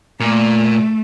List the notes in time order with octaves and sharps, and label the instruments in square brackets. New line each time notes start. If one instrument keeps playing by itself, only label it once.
[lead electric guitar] A#2 [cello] A3